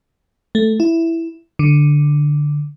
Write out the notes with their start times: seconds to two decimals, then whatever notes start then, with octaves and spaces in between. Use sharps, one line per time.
0.55 A3
0.80 E4
1.59 D3